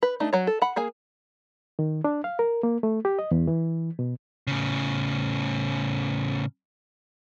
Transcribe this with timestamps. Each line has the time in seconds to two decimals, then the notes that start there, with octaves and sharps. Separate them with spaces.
0.03 B4
0.20 A3 D4 D#4
0.33 F#3 C#5
0.47 A4
0.62 F#5 B5
0.76 A#3 G#4 G#5
1.79 D#3
2.04 D4
2.24 F5
2.39 A#4
2.63 A#3
2.83 A3
3.05 G4
3.19 D#5
3.31 E2
3.47 E3
3.99 B2
4.47 A2 C#3